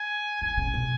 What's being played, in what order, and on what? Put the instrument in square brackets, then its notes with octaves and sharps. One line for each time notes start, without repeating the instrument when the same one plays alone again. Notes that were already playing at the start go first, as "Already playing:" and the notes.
Already playing: [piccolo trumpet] G#5
[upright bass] E3 [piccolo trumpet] G#5
[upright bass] C#3
B2